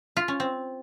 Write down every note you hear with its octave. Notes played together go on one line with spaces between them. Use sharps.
F4
C#4
C4